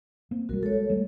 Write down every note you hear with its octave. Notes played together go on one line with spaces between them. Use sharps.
A#3 C4
B1 G3 F#4 A#4
G#3 A4 C#5
G3 A3